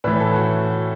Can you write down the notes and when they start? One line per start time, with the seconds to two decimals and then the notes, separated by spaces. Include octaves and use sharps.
0.04 A2 E3 B4
0.20 A4
0.36 F#4